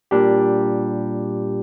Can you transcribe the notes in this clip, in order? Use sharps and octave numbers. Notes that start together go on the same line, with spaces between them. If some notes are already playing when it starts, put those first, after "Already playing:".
A#2 G3 D4 G4